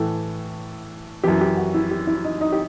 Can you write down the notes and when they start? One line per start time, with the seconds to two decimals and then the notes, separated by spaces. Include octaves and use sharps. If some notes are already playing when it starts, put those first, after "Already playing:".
Already playing: A2 E3 A4
1.24 F#2 E3 G4
1.41 G4
1.57 F#4
1.74 E4
1.91 G4
2.07 E4
2.25 D#4
2.41 D#4
2.52 G4